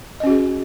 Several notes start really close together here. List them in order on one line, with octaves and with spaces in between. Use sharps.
D#5 C#4 F#4 G#4